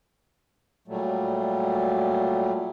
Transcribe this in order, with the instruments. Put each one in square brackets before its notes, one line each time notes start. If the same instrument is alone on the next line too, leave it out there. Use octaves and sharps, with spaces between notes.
[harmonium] A#2 F#3 G3 A3